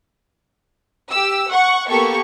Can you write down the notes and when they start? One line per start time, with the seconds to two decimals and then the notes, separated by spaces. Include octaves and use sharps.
1.11 G4 E6
1.50 F#5 C#6
1.89 A#3 B3 G4 A4 C#6